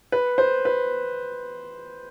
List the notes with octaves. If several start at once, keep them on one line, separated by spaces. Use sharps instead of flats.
B4
C5
B4